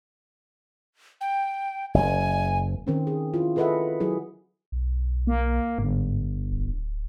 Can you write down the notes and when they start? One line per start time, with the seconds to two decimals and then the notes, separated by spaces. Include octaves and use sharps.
1.21 G5
1.94 F#1 G#5
2.87 D#3 C4 C#4
3.07 G#4
3.34 E4 F4
3.56 G#4 A4 B4 D#5 E5 F#5
4.00 F#3 E4 G#4
4.72 B1
5.27 A#3
5.78 G1 G#2
6.51 D1